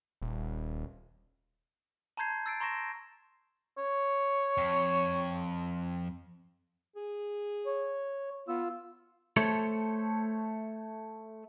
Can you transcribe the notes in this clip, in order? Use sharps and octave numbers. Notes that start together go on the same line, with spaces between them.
D#1
A5 A#5 C6 G6 G#6 C7
E6 A6 C7 D7
A#5 C6 C#6 A#6 E7
C#5
F2
G#4
C#5
B3 F4 E6
A3 A4 C5 C#5